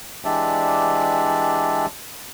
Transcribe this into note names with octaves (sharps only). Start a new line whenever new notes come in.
E3 G#3 D4 G4 D5 E5